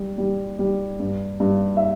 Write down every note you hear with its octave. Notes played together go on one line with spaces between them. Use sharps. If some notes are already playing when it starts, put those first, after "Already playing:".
Already playing: G3
G3
G3
G2
G2
E5